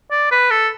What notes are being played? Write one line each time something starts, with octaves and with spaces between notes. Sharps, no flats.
D5
B4
A4